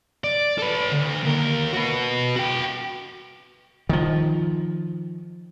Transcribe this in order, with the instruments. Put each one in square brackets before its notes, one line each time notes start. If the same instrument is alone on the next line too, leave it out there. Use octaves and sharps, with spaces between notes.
[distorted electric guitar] D5
A4 B4
D2
D#2 A#4
F#4 B4
F#4 G5
[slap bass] D#3 F3